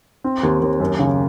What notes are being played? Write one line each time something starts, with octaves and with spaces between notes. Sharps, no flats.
C4
D#2
D#2
F#2
C#3